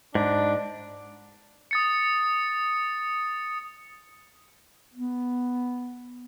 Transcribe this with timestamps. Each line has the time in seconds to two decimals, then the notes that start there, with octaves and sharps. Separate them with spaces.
0.15 G#2 D4
1.71 D#6 A6 C#7
4.94 B3